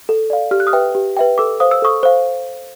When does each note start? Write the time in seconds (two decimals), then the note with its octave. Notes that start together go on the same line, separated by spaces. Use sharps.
0.09 A4
0.30 D5 F5
0.51 G4 F6
0.60 F#6
0.67 D#6 F6
0.73 B4 E5 G5
0.95 G4
1.17 B4 E5 G5
1.38 A4 D6 E6
1.60 C5 F5 D#6
1.71 E6
1.82 A4 C#6 D#6
2.03 C5 F5